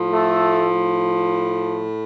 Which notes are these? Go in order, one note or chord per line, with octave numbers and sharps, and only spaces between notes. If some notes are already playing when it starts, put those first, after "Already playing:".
Already playing: A2 F3
A3 A4